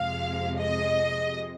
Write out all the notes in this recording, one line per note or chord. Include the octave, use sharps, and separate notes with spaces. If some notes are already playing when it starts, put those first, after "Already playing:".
Already playing: F2 C3 G#3 F5
D#5